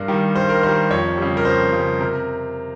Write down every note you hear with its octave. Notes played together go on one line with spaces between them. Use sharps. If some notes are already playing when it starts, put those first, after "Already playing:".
Already playing: G2 A#4
D#3 G3
G2 C5
A#4
D#3 G3 C5
F2 C#5
C#3 G3
A#4
F2 C5
C#3 G3
C3 A#4